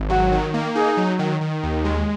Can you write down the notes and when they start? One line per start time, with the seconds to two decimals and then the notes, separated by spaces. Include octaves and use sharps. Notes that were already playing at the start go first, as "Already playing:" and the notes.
Already playing: G#1
0.09 F#3 F#4
0.32 D#3
0.54 A#3
0.75 D#4 G#4
0.97 F#3
1.19 D#3
1.41 D#3
1.63 D#2
1.85 G#3